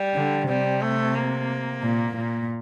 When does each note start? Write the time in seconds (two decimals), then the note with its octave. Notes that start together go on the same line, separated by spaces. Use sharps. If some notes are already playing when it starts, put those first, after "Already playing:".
Already playing: G3
0.14 D3
0.49 C3 G3
0.82 A3
1.15 A#3
1.83 A#2
2.17 A#2